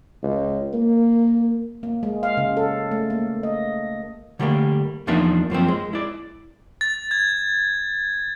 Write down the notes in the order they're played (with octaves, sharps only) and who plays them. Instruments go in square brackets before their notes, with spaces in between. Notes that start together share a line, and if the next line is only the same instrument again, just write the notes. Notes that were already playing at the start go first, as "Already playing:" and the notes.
[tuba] C#2
A#3
[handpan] A#3
G#3
F5
C#3
A4
A3
A#3
D#5
[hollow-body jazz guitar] D3 G3 A3 A#3
E2 F3 A#3 D4 D#4 E5
F#2 F3 A#3 C4
G#3
E4 D5
[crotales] A6
G#6